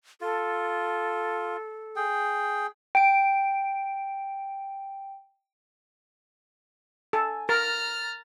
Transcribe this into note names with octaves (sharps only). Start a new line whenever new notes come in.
F4 A4
G#4 G5
G5 D7
A4 G#5
A#4 A#5 F6 A6